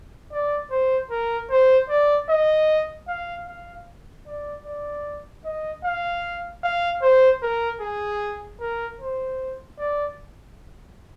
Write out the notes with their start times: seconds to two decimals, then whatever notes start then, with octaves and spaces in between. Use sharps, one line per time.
0.32 D5
0.71 C5
1.10 A#4
1.50 C5
1.89 D5
2.29 D#5
3.08 F5
3.47 F5
4.27 D5
4.65 D5
5.45 D#5
5.84 F5
6.63 F5
7.02 C5
7.42 A#4
7.81 G#4
8.60 A#4
9.00 C5
9.78 D5